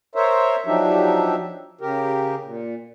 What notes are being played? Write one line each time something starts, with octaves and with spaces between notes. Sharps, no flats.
A#4 C5 C#5 E5
F3 F#3 D4 D#4 G4 E5
C#3 G4 A#4
A#2